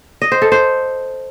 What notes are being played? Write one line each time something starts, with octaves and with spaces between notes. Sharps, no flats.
D#5
C5
A4
C5